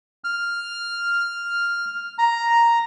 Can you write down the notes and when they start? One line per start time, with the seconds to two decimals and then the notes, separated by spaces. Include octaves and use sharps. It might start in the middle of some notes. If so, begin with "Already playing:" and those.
0.24 F6
2.18 A#5